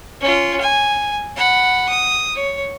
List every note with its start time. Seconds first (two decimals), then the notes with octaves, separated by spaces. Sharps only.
0.21 C#4 F4
0.61 G#5
1.36 F#5 B5
1.89 D#6
2.35 C#5